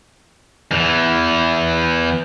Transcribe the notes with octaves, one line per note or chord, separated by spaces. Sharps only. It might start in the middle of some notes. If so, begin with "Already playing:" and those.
E2 E3